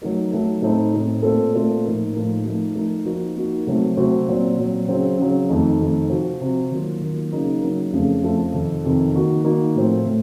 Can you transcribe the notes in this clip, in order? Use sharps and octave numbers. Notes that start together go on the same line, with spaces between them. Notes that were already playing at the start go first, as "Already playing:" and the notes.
F#3 A3 D#4 A#4
F#3 A3 D#4 A#4
A2 A3 C4 D#4
A2 A3 C4 D#4
A#2 A3 C4 F4 A4
A#2 A3 C4 F4 A4
A2 F3 A#3 D#4 A#4
A2 F3 A#3 D#4 A#4
F3 A3 D#4 A#4
F3 A3 D#4 A#4
F3 A#3 D#4 F#4 A#4
F3 A#3 D#4 F#4 A#4
C3 F#3 A3 C4 F#4
C3 F#3 A3 C4 F#4
A#2 F#3 C4
A#2 F#3 C4
C#3 F#3 C4
C#3 F#3 C4
F2 D#3 A3 D#4
F2 D#3 A3 D#4
C3 F3 C4 F#4
C3 F3 C4 F#4
D#3 F#3 A#3 F4
D#3 F#3 A#3 F4
C#3 F#3 A#3 D#4 A#4
C#3 F#3 A#3 D#4 A#4
F2 C#3 F3 A3
F2 C#3 F3 A3
F2 C3 D#3
F2 C3 D#3
D#3 A#3 D#4 F#4 A#4
D#3 A#3 D#4 F#4 A#4
A2 F3 C4 F#4
A2